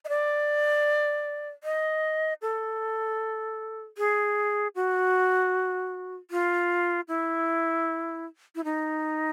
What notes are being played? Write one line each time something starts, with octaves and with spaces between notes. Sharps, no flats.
D#5
D5
D#5
A4
G#4
F#4
F4
E4
E4
D#4